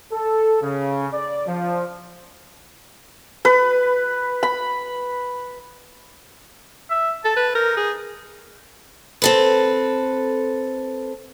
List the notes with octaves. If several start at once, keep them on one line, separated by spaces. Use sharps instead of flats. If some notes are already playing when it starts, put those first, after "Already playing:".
A4
C#3
D5
F3
B4
B5
E5
A4 A5
B4
D#4 A#4
G#4
C4 A4 B4